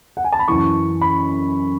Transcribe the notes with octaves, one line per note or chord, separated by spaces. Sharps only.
F#5
G#5
A5
B5
F#2 E3 C#6
B5